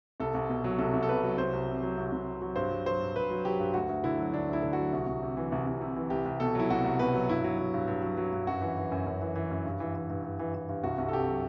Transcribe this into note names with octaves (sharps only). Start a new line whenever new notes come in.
C2 A4
C2
B2
F#3
C2 A4
C2
A4
B2 B4
F#3
C2 C5
C2
C3
F#3
C2
C2
C3
F#3
G2 C5
F#3
F#3 C5
G2
G2 B4
F#3
F#3 G4
G2
D2 F#4
D2
D3 E4
F#3
D2 D4
D2 E4
D3
F#4
F#3
C2
C2
C3
E3
C2
C2
C3
E3
C2 G4
C2
B2 A4
F#3 E4
C2 F#4
C2
B2 B4
F#3
G2 E4
F#3
F#3
G2
G2
F#3
F#3
G2
F#2 F#4
E3
E3
F#2
F#2
E3
E3
F#2
G2
E3
E3
G2
G2
E3
E3
G2
C2 F#4
C2
A4
C3 G4
F#3